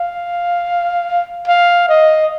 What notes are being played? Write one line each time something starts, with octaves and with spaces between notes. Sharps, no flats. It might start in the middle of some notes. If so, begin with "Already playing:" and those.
Already playing: F5
F5
D#5